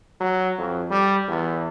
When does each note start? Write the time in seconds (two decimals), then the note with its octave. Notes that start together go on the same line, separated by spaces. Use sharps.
0.21 F#3
0.58 F2
0.91 G3
1.28 E2